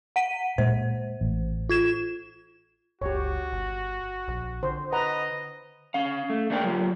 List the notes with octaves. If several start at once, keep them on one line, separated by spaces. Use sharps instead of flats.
F#5 B6 D#7
A#2 G#3 C5
A1
F4 G#6 E7
F#1 C#2 F#4 G4 C#5
G1
A#1
D3 C5
B4 D#5 F#5 A#5
C#4 F5
A3
A3 A#3 D4 G#4 A#4 G5
F#3 F4 G4